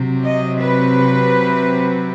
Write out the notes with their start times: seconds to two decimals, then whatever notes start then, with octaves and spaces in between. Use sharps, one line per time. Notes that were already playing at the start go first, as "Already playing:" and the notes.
Already playing: C3 F#3 C4
0.25 D#5
0.60 B4